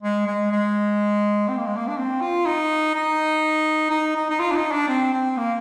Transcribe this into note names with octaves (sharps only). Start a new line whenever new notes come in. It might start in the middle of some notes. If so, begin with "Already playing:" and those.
G#3
G#3
G#3
C4
A#3
G#3
A#3
D4
C4
F4
D#4
D#4
D#4
D#4
D#4
F4
D4
D#4
D4
C4
C4
A#3